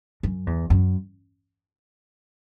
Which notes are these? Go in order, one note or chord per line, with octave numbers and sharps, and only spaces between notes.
F#2
E2
F#2